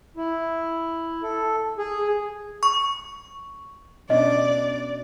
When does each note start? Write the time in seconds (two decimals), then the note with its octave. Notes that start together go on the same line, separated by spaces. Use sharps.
0.17 E4
1.23 A4
1.78 G#4
2.63 C#6
4.10 B2 C#4 D4 D5 D#5